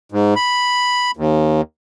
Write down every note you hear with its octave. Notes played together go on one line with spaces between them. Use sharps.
G#2
B5
D#2